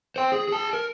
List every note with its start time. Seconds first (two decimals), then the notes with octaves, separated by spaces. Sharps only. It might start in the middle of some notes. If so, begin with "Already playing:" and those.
0.16 C5 G5
0.32 G#4
0.48 G#4 A5
0.73 A#4